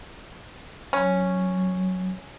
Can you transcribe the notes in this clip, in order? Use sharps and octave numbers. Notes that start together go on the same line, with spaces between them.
F#3 C#4